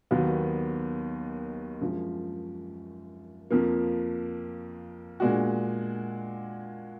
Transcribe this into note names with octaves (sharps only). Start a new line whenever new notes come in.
D#2 D#3 F#3 B3
F#2 F3 G#3
F2 F3 A#3
A#2 G#3 D4 F#4